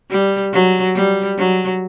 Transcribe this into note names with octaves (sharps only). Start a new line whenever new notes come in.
G3
F#3
G3
F#3